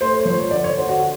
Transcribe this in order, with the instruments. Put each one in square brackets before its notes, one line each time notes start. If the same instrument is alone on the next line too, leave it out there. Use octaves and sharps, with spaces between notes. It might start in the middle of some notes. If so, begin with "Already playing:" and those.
[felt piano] A3 C5
C#5
F3 C5
C#5
D3 D5
C#5
D3 C5
F#4